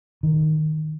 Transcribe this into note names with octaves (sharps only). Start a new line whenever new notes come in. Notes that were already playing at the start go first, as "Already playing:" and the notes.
D#3